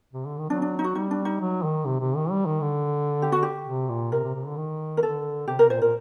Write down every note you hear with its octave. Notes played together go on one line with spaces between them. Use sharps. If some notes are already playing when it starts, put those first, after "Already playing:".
C3
D3
D#3
F#3 D4
D4
D#4
F#4
G3 D#4
D4
D#4
F#3
D#3
C3
C3
D#3
G3
D#3
D3
G4
F#4
G4
C3
A#2
C3 A#4
C3
C3
D3
D#3
A#4
D3 A4
C3 G4
C3 A#4
A#2 C5
A#2 A#4